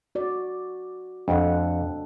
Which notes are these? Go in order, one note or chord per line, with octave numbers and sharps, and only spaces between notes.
F#4 D5
F2 D4 A4 F#5